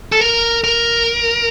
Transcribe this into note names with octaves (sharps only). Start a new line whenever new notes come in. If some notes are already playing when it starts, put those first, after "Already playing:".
A4
A#4
A#4